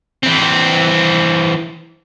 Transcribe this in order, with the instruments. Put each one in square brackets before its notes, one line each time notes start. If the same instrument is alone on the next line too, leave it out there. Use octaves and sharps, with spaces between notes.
[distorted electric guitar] E3 C4